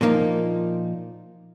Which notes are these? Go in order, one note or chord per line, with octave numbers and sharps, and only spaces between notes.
A#2 F3 A#3 D#4